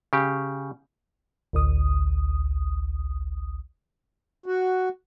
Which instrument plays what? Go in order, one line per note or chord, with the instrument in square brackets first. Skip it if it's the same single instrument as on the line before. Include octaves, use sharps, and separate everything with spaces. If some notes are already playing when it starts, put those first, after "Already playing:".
[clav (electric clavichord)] C#3 G4
[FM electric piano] A1 D2 D#6
[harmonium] F#4